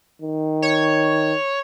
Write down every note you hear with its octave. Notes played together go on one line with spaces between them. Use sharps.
D#3
C#5